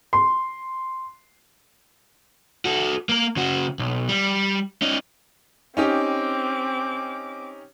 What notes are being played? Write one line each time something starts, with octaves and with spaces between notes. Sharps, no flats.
C6
F#4 A4
A#3 A#4
C#3 F#4
B1
G3
C#4 D#4
C4 C#4 D#4 G4 D6